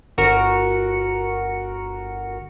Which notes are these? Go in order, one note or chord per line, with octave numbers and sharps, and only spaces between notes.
G1 F#4 A#4 C#7